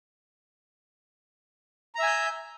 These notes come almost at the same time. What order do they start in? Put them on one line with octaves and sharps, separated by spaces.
A#5 E5 G#5 G6